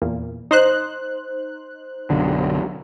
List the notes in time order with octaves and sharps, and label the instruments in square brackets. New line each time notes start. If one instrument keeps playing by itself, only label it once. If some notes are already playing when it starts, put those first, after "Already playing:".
[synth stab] E2 A#2
D#4 C5 F#6
[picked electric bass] B1 F#2 D3